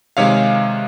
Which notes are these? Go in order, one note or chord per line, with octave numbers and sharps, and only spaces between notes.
C3 D#3 G#3 C#5 F5